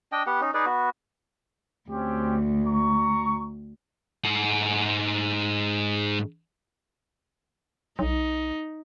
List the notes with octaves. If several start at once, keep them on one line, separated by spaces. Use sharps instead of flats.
D4 D#5 G5
B3 G4 F#5
C#4 D#4
D#4 G#4 B4 D5
B3 F#4
D2 C4 C#4 G4
A#5 C#6
G#2 F#5
B1 D#4